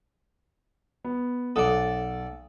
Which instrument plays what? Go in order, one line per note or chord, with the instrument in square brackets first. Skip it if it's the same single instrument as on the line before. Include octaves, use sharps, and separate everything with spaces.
[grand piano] B3
[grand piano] B1 F#5 D#6 [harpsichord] A4 D5